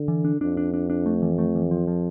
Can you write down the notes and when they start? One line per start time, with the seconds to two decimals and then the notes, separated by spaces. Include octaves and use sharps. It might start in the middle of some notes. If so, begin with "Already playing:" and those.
Already playing: D3
0.08 E3
0.25 D4
0.41 F2 D4
0.57 D4
0.74 D4
0.90 D4
1.06 A3
1.22 E3
1.38 A3
1.55 E3
1.71 F3
1.87 F3